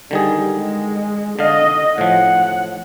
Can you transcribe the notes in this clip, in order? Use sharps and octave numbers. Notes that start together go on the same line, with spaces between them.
D3 D#3 G3 G#4
G#3
D3 D#5 F5
A2 F3 F#5